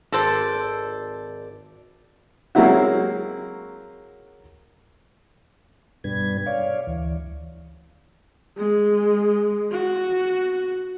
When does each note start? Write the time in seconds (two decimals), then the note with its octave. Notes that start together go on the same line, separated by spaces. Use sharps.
0.12 G#1 A4 C5 D5
2.55 F#3 G#3 A#3 C4 E4 F#4
6.04 G2 B2 G3 D4 B4 G#6
6.46 C#5 D5 F5
6.87 D2 E3
8.57 G#3
9.71 F#4